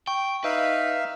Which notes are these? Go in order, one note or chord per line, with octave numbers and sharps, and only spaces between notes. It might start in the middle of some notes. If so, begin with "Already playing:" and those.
G5 C#6
D#4 B4 E5 F5